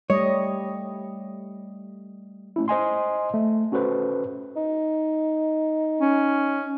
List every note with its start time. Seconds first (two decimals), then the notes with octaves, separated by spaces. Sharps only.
0.10 G3 A3 C#5 D#5
2.56 A3 C#4 E4
2.68 C5 D#5 G#5 C6
3.34 A3
3.72 C#4 F#4 A4 B4 C5
4.56 D#4
6.01 C#4